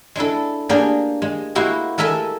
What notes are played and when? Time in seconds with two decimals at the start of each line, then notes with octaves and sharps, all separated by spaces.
0.16 G#3 D4 E4 A4
0.69 A#3 D4 G4 G#4 A#4 D5
1.22 G#3
1.55 G#3 A#3 E4 F#4 G4
1.98 G#3 A4 A#4 E5 G#5